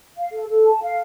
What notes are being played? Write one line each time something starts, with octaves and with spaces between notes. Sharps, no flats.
F5
A4
A4
A5
F5